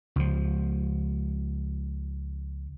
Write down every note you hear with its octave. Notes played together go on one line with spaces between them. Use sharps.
C#2 F3